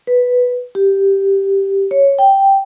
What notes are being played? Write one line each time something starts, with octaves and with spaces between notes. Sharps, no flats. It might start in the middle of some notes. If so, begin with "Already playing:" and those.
B4
G4
C#5
G5